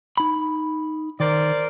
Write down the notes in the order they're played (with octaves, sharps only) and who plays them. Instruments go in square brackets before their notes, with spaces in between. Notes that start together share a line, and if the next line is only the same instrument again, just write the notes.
[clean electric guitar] D#4 B5
[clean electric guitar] D#3 [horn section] A#4 C5 D5